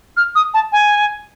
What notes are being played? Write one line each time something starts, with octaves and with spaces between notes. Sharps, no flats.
F6
D#6
A5
G#5